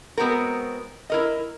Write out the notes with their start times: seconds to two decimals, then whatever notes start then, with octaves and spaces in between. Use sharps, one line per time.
0.17 G#3 B3 C4 F#4 A#4
1.10 E4 A#4 D#5